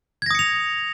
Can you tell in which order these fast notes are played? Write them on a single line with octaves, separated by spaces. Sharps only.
G#6 A#6 D#6 C#7 F7